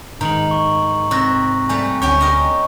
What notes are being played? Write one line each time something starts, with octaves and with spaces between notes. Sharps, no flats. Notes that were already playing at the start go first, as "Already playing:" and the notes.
G#2 D#3 A#5 F#7
C#6
C3 C#6 F#6 A#6
G3 A3 G#5
D2 C#4 G4 G5 C#6
G4 A#4 D#5